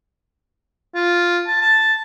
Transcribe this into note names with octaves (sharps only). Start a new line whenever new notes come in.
F4
A5
A5